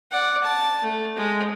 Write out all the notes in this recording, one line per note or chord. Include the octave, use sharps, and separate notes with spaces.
D5 F#5
A5
A3
G#3